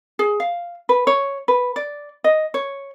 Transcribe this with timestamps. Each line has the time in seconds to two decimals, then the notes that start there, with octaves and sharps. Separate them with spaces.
0.19 G#4
0.40 F5
0.89 B4
1.07 C#5
1.48 B4
1.76 D5
2.24 D#5
2.54 C#5